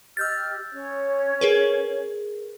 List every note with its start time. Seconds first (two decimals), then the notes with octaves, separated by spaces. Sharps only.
0.17 G4 D#5 E6 F6 G6 A6
0.72 C#4 C#5
1.41 G#4 A#4 B4